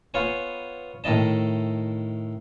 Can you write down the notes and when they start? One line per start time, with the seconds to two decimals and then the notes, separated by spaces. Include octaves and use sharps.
0.14 B3 F4 C#5 G#5
1.04 A2 D#3 E4 D#5 A5